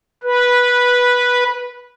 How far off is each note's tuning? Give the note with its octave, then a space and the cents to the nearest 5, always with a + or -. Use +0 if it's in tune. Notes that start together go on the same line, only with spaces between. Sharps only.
B4 -10